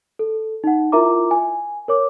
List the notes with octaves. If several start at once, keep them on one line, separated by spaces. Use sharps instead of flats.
A4
D#4 F#5
E4 F4 A#4 E5 A#5 D6
G#5
A#4 C#5 D6